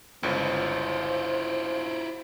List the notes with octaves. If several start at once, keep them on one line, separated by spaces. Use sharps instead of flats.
G1 C#2 E4 F4 C5